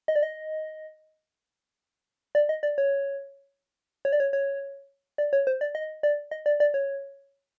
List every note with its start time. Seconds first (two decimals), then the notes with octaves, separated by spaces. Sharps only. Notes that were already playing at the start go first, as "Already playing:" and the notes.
0.08 D#5
0.16 D5
0.23 D#5
2.35 D5
2.49 D#5
2.63 D5
2.78 C#5
4.05 C#5
4.13 D5
4.20 C#5
4.33 C#5
5.18 D5
5.33 C#5
5.47 C5
5.61 D5
5.75 D#5
6.03 D5
6.31 D#5
6.46 D5
6.60 D5
6.74 C#5